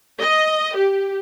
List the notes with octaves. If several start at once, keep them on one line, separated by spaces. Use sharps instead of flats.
D#5
G4